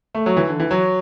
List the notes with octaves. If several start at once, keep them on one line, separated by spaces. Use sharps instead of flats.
A3
F#3
E3
D3
E3
F#3